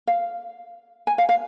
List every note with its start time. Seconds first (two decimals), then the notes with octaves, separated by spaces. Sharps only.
0.07 F5
1.07 G#5
1.18 F5
1.29 F5